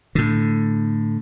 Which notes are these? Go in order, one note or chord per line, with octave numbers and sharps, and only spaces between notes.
A2 D3